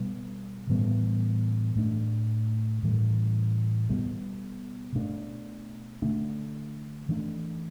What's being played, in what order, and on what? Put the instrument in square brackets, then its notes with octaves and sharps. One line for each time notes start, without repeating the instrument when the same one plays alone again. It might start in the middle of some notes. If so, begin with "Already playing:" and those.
Already playing: [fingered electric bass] B2 G3 B3
A2 E3 G3 B3
A2 A3 D4
A2 E3 G3
B2 G3 B3
B2 A3 D4
D3 A3 D4
E3 A3 D4